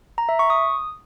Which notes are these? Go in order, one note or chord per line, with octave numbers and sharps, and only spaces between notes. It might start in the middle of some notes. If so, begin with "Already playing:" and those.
A#5
E5
C#6
D#6